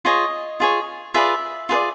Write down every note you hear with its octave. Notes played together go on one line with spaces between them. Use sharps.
F4 G#4 C#5 D#5
F4 G#4 C#5
F4 G#4 B4 D5 E5
F4 G#4 B4 D5